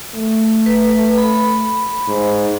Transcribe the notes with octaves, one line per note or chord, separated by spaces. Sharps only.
A3
B4
B5
G#2